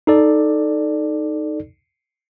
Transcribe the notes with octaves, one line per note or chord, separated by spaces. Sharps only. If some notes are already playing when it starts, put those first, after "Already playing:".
D#4 A4 D5